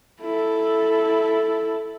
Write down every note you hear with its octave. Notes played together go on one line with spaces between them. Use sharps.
E4 A4